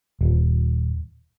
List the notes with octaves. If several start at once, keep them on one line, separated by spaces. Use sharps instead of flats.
D#1